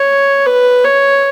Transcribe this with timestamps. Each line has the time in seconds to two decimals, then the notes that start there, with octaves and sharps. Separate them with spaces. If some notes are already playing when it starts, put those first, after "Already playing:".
Already playing: C#5
0.46 B4
0.84 C#5